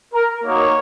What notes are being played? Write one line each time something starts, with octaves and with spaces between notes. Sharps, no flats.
A#4
A#3 D#4 F#4 C#5